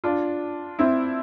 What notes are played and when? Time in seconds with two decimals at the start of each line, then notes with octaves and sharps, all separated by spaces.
0.04 D4 F4
0.79 C4 E4